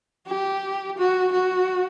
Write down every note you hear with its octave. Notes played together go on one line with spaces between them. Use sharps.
G4
F#4
F#4